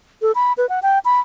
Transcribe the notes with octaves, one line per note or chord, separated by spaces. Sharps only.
A4
B5
B4
F#5
G5
B5